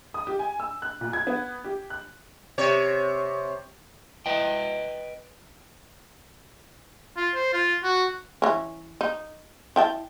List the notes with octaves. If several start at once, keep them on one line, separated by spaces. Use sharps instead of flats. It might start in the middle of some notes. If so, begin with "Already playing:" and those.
D#6
G4
G#5
E6
F#6
A#2
G#6
B3
G4
F#6
C3 C#5
B4 D#5 G5
F4
C5
F4
F#4
E3 C#4
D#4
E4 G5 A5